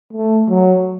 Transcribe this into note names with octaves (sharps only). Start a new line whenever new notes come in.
A3
F#3